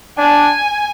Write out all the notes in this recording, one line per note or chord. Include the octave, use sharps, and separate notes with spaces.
D4 G#5